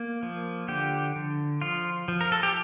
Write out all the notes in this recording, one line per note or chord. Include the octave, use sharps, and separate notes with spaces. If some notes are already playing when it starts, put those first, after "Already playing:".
Already playing: A#3
F3
D3 G4
D3
F3 F4
F3
A#4
A4
G4